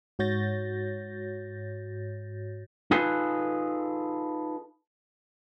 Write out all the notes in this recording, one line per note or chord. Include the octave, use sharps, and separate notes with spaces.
G#2 F#4 C#5 G6 A6 A#6
D#4 F4 G#4 A4 B4